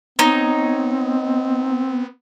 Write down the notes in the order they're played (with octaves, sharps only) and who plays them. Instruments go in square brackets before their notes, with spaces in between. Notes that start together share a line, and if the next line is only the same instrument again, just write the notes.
[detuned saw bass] B3 [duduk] C4 [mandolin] D#4 C#5